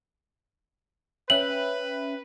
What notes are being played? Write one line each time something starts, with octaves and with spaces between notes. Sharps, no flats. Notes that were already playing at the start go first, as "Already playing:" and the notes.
C#4 B4 E5 G5 F#7